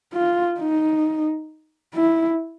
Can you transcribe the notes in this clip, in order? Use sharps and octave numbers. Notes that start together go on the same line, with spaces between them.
F4
D#4
E4